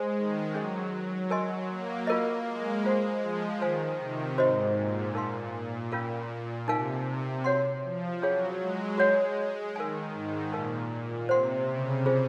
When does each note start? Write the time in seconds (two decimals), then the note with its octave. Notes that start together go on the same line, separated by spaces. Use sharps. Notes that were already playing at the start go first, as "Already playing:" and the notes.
Already playing: G#3 G#4 C5
0.16 D#3
0.54 F#3 C#4 G#4 D#5
1.30 A#4 D#5 G#5 C6
1.69 A#3
2.07 F4 A#4 D#5
2.46 G#3
2.84 G#3 F4 C5 F#5 C6
3.23 F3
3.61 D#3 C5 F5 G#5
3.99 C3
4.38 G#2 F#4 C5 D#5
4.76 A#2
5.15 D#4 A#4 F5 C6
5.92 A#2 C#4 F4 A#4 F5
6.68 C3 D#4 A#4 F5 G#5
7.07 C3
7.44 F#4 C#5 F#5 C6
7.83 F3
8.22 F#3 C#4 F4 G#4 C#5 F5
8.60 G#3
8.98 G#3 F#4 C#5 F#5
9.75 D#3 A#4 F5 G#5
10.13 G#2
10.52 A#2 D#4 A#4 F5
10.91 A#2
11.29 C3 C5 F#5 C6
11.67 C#3
12.06 F4 G#4 C5